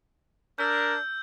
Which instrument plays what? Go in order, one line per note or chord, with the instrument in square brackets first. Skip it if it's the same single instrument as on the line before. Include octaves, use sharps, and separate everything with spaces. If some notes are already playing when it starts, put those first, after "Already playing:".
[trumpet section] D4 A#4 [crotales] E6 G6